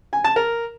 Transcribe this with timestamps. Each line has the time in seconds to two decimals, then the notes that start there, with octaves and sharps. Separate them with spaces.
0.13 G#5
0.24 A5
0.36 A#4